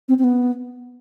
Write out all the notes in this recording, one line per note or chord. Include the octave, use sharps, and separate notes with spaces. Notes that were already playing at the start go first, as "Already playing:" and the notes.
C4
C4
B3